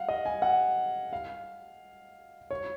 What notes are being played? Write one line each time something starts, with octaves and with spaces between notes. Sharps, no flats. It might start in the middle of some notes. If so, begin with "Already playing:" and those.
Already playing: F5 F#5
D#5
G#5
F#5
F5
C#5